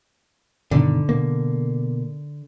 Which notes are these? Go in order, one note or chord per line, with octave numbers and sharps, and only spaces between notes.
G2 B2 D3 D#3
B2 A#3